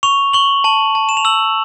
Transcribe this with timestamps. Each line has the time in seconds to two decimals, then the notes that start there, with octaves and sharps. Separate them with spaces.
0.03 C#6 F7
0.33 C#6 F#7
0.64 A5 F#7
0.95 A5
1.09 E7
1.17 F7
1.25 E6 F#7